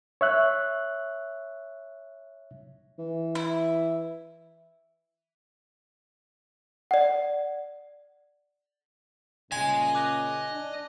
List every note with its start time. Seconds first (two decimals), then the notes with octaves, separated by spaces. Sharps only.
0.21 C#5 E5 F#6
2.99 E3
3.35 E4
6.91 D5 F#5
9.52 A#2 C#3 D#5 G#5 C6
9.95 D6 F#6 F7
10.52 D4